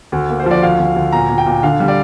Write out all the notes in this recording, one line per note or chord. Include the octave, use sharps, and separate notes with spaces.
D2
A#3
C5
F3 D5
D2 F5
D2
D2
A#2 A#5
A#2
G5
A#2
D3 F5
G3
D5